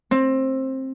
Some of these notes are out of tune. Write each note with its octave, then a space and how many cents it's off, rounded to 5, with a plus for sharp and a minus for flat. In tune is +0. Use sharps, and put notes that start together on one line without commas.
C4 +20